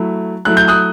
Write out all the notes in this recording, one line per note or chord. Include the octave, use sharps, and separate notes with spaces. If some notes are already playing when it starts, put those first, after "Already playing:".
Already playing: F#3 A3 E4
F#3 A3 E4 F#6
G6
D#6 F#6